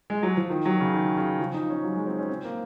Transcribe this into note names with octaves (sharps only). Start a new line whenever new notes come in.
G#3
F#3
F3
D#3
F#3
C#3
D#3
C#3
F3
D#4
C#4
F#3
G#3
C4
C#4
C4
A#3